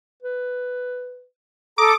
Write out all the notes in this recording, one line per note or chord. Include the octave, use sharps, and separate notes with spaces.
B4
A4 A#5 D6 D#6